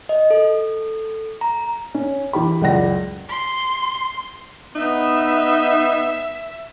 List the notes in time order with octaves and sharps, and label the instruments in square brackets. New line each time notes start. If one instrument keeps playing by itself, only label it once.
[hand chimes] D#5
A4
A#5
[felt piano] C#4
E3 G4 B5
C#2 F#2 D5 F#5 A#6
[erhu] C6
[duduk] B3 [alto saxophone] D#4 [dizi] E5